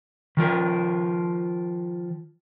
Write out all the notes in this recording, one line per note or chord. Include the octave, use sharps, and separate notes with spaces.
D#3 F3 A#4